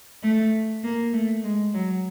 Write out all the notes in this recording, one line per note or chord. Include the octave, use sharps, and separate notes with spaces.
A3
A#3
A3
G#3
F#3